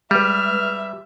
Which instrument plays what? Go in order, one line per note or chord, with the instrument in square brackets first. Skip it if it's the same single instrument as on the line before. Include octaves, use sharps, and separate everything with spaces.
[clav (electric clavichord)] G3 [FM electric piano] G#3 B4 [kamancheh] E5 [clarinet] F6